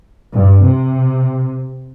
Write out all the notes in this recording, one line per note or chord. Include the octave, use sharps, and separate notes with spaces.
G2
C3